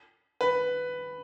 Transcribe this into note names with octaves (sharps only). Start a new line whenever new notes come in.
B4